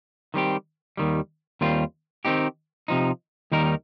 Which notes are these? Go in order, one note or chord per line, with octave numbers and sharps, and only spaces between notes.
D#3 G3 C4 G4
D#2 D#3 G3
D#2 D#3 G3 C4 F4
D#3 C4 D#4 G4
C3 F3 D#4
D#2 D#3 G3 D#4 A#4